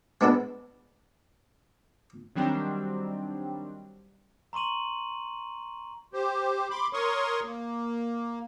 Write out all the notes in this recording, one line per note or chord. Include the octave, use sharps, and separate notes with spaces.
G#3 B3 D4 A4 B4
D#3 F#3 G3 C4 D4
A#5 C6 C#6 D#7 F#7
G4 C5
B5 C6 D6
A#4 C#5 C6 C#6 D#6
A#3